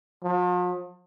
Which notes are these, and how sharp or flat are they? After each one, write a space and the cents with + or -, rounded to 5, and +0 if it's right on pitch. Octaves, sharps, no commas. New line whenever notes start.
F3 +45